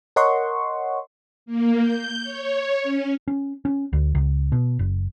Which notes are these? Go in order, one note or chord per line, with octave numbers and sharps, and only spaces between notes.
A#4 C#5 D#5 F#5 C6 C#6
A#3
G6
C#5
C#4
C#4
C#4
D2
C#2
B2
F#1